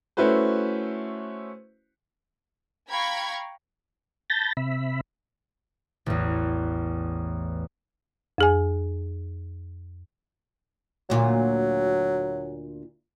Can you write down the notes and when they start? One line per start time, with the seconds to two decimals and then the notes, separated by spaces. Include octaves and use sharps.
0.17 A3 C#4 E4 F#4 B4 C5
2.89 F5 G5 A#5 B5 C#6 G#6
4.30 A5 B5 G6 A6 A#6
4.57 C3 E5 B5
6.06 A1 E2
8.38 F2 G#4 G#5
11.10 D2 A#2 F#3 F4